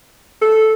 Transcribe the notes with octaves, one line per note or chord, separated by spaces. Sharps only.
A4